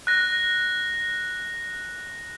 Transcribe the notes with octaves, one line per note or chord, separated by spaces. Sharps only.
F#6 A#6